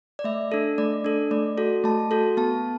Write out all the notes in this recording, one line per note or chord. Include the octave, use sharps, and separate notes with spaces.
D5
A3 E5
D4 A4
A3 D5
D4 A4
A3 D5
F#4 A4
A3 A5
F#4 A4
B3 A5